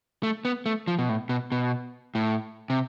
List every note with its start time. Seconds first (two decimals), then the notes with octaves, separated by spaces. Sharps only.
0.23 A3
0.45 B3
0.66 A3
0.87 F3
0.99 B2
1.09 A2
1.29 B2
1.52 B2
2.15 A2
2.70 C3